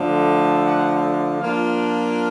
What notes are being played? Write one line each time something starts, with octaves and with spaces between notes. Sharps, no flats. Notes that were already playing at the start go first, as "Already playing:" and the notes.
Already playing: D3 F3 A3
F#5
F3 A#3 D4 F4 F5